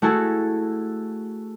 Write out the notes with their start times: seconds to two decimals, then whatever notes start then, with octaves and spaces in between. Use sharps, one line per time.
0.02 A3 E4 F#4 G#4 A4